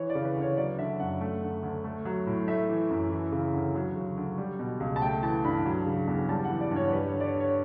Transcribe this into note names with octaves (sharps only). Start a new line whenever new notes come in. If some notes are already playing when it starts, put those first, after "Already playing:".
Already playing: E3 C#5
D5
C#3
B4
D2
C#5
F#3 D5
D3 E5
F#2 F#5
A3
D3
D2
A3
F#3
A2
A3 E5
E3
F#2
E3
C#3
D2
F#3
C#3
D2
G3
B2
C#2
A5
A3 G5
E3 A5
G2 B5
F#3
C#3
E2
G3 A5
F#5
E3
D5
G2
C#5
G3 B4
C#5
D3
D5
C#5
D2
C#5